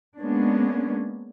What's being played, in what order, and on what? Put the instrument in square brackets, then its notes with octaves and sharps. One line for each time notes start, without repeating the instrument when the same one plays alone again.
[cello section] G#3 A#3 B3 C#4 D4